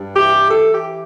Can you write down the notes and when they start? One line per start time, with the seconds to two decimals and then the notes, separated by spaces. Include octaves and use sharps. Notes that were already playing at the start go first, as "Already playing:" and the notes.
Already playing: G2
0.16 E3 G4
0.51 E3 A4
0.74 G4